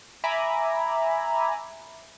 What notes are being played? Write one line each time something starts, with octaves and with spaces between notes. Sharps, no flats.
E5 G#5 A#5 B5 D6